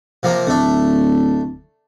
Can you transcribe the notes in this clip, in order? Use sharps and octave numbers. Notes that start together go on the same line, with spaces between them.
C3 F3 A#3
D1 A3 D4